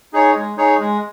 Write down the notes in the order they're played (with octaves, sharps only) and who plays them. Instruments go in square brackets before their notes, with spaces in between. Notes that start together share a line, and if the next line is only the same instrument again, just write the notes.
[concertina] D#4 G#4 C#5
G#3
D#4 G#4 C#5
G#3